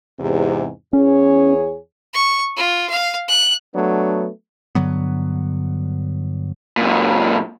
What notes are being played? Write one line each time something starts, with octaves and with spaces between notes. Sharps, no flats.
E2 G#2 C3
E2 C#4 G#4 C#5
C#6
F4
F5
F#6
F#3 A3 B3 D4
G2 D3 F#3 B3
F#2 A#2